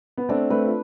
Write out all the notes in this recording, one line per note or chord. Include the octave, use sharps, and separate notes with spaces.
B3
A3 C4 D4
A3 C4 B4
F4